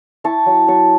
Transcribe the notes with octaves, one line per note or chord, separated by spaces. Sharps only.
E4 A5 C#6
F#3
F#3 A5 C#6